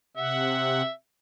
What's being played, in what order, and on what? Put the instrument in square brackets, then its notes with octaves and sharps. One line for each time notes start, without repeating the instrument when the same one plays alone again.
[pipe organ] C3 F#5 [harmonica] E5